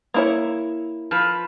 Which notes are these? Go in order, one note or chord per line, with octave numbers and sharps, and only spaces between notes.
A#3 E4 C#5
F3 B4